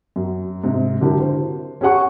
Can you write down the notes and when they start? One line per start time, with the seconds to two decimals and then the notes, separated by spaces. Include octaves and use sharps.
0.16 F#2
0.64 G#2 C3
1.01 D3 F#3 D4 E4 G4 A#4
1.20 C5
1.81 C#4 G4 G#4 F#5 C#6